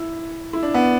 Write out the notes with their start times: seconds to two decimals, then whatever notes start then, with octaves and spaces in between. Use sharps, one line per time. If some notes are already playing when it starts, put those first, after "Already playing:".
Already playing: E4
0.53 E4
0.63 D4
0.74 B3